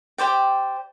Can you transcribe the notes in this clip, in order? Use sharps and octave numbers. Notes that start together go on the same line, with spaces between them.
G4 C5 D5 G5